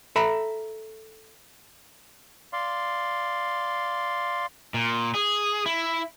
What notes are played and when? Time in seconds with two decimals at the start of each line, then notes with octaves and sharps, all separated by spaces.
0.16 A4 E5 A#5 B5
2.53 D5 F5 C6
4.74 A#2
5.14 G#4
5.66 E4